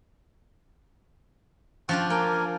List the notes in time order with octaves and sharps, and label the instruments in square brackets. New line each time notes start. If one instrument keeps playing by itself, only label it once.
[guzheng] F3 D4 F4 [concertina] G5 C#6 F#6
[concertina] A#3 A#4 G#5 [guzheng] G5